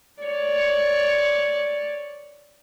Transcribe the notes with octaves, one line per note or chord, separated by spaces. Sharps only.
C#5 D5